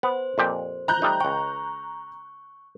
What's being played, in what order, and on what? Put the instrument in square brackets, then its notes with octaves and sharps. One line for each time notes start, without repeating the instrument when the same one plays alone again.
[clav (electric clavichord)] B3 [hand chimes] C5
[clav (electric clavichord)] F2 A#2 G4
[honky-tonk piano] A#5 F#6 G6
[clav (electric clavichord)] G3 A3 D#4
[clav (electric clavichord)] C#2 G5 [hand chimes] C#6